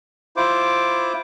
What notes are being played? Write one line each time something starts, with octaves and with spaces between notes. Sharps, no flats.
E4 F4 C5 D6